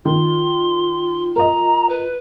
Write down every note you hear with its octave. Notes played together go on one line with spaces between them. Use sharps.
D#3 F4 C6
A#4 D#5 A#5
B4